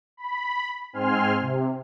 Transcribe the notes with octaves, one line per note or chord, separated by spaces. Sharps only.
B5
G#2 C4 G#5 C6 F6
C3